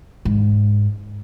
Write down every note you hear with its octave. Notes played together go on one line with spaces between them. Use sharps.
G#2